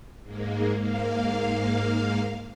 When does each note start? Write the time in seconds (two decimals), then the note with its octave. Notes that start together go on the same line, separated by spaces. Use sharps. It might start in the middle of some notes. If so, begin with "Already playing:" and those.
0.23 G#2 G#3 A#3
0.80 G#2 A#3 F5